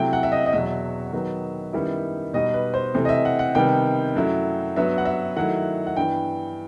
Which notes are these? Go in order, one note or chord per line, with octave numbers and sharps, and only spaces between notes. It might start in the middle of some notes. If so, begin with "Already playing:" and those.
Already playing: C3 F#3 A3 E4 G5
F#5
E5
D#5
D#5
E2 B2 F#3 E5
D#3 F#3 B3
F#2 D#3 G3 B3 E4
B2 G3 D#4 D#5
B4
C5
C3 E3 A3 C4
D#5
E5
F#5
F#5
C3 D#3 G3 B3 G5
F#2 F#3 A3 E4
G2 F#3 B3 E5
F#5
E5
D#3 F#3 A3 E4 F#5
F#5
G2 E3 B3 G5